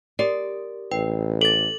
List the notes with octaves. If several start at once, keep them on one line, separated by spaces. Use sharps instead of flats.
G4 A#4 D5
A1 B4 G5
A4 A6 F#7